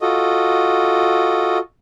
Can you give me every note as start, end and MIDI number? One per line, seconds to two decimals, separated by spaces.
0.01 1.58 65
0.01 1.58 66
0.01 1.58 69
0.01 1.58 75